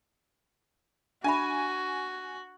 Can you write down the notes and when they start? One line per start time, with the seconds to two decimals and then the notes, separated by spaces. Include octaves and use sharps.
1.24 D4 F#4 E5 G#5 B5